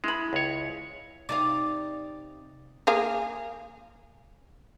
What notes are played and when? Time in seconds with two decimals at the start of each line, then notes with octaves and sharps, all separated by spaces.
0.04 G#3 E4 B5
0.33 C#2 C#5
1.29 C3 D#4 D5 F5
2.87 A#3 G#4 F5